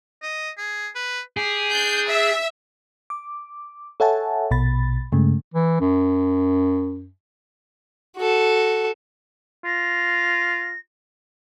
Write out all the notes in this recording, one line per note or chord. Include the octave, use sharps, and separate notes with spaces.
D#5
G#4
B4
G4 G#4
D4 G6
E5
D6
A4 C#5 E5 F#5 G#5 A5
A#1 B2 B5 A6
G2 C#3 G#3 A3
E3
F#2
F#4 A4
F4 A#6